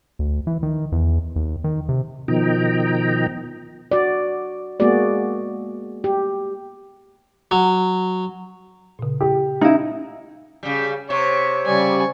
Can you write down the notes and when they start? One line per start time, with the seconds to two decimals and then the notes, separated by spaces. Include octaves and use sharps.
0.19 D2
0.47 E3
0.63 D#3
0.92 E2
1.36 D#2
1.64 D#3
1.89 C3
2.28 B2 D#3 F3 D#5 G5 A#5
3.91 F#4 D5
4.80 G#3 A#3 B3 F#4 G#4 D5
6.04 G4
7.51 F#3
8.99 A#2 C#3
9.21 G4
9.61 C#4 D#4 E4 F5
10.63 C#3 G3
11.10 C3 C#5 C#6
11.66 C#3 G3 D5 G#5 C#6